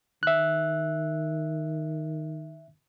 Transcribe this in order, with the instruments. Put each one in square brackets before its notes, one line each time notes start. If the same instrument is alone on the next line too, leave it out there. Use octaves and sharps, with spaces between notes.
[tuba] D#3 [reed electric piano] E5 F#6